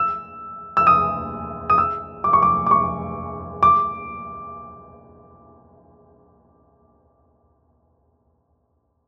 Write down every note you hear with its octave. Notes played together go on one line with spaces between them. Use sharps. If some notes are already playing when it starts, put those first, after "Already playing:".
Already playing: E6
E6
D#6
D#6
E6
D6
C#6
D6
D6
C#6
D6